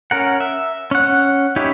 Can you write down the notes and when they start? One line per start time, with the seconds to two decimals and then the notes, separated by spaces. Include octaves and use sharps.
0.11 C#4 A#4 F#5
0.40 E5
0.91 C#4 F#5
1.56 C#4 D#4 E4 G4